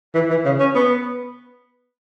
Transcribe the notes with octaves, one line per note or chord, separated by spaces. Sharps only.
E3
E3
C#3
C#4
B3